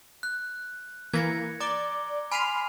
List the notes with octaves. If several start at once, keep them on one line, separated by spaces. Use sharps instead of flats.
F#6
E3 A#3 G#6 A#6 C#7
D5 A#5 D6 G7
G#5 B5 C6 F6 D#7 F7